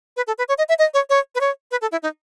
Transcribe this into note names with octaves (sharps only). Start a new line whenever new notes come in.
B4
A4
B4
C#5
D#5
E5
D#5
C#5
C#5
B4
C#5
B4
A4
E4
D#4